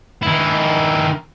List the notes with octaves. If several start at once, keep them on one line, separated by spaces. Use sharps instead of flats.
D#3 E4